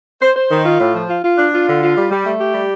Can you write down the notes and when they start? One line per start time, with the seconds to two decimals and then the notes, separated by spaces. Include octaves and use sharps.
0.22 C5
0.35 C5
0.51 D#3
0.65 F4
0.79 A2
0.94 F3
1.08 F4
1.23 F4
1.38 D4
1.53 F4
1.68 D3
1.82 F4
1.96 G3
2.11 G3
2.26 A3
2.41 G4
2.54 G3